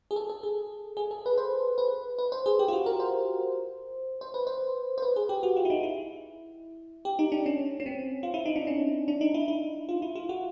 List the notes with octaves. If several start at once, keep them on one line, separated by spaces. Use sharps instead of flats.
G#4
A4
A4
G#4
G#4
A4
B4
C5
B4
B4
C5
G#4
G4
F4
F#4
A#4
C5
C5
B4
C5
C5
B4
G#4
G4
F#4
F4
E4
D#4
E4
G4
D#4
D4
C#4
C#4
C4
F4
E4
D#4
D4
C#4
D4
D#4
E4
E4
F4
E4
F4
F#4